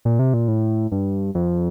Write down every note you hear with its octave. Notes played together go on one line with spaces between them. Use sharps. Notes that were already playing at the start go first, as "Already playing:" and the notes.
A#2
C3
A#2
A2
G2
F2